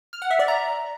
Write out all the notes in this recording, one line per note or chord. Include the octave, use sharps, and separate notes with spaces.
F6
F#5
E5
D5
A#5